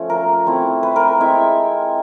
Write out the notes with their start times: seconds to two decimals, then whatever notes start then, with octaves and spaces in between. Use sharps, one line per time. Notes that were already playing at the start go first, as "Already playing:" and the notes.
Already playing: F3 A3 C#4
0.10 A#4
0.46 A3 C4 E4
0.83 B4
0.96 A#4
1.20 G#3 C4 E4 E5